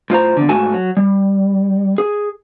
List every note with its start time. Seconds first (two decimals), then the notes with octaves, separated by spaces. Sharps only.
0.10 A2 F4 C5 A#5
0.37 E2 D3
0.49 G#2 A3 F#4 G#5 A5
0.74 F#3
0.97 G3
1.98 G#4